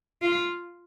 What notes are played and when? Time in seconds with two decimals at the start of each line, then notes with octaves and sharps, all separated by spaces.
0.22 F4